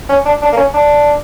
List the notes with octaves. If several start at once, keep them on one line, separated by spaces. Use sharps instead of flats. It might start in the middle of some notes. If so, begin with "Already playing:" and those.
C#4
D4
D4
A#3
C#4
D4